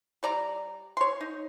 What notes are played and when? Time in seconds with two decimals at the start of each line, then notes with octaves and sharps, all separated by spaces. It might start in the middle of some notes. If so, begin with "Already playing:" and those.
0.23 G3 D5 A#5
0.97 C#5 C6
1.21 D#4